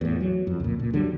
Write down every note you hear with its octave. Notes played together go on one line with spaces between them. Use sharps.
E2 A2
F#3
F2
C#2 A#2
A#2
D2 D3 F#3 G3